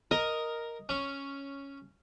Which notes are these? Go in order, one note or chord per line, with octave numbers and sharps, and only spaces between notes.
A#4 D#5
C#4